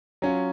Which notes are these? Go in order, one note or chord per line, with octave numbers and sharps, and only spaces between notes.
F#3 C#4 F4